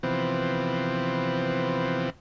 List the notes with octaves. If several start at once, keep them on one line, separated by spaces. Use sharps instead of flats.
C3 E3 F3 B3 C4